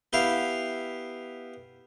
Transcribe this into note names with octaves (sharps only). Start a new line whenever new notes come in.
B3 E4 G4 F5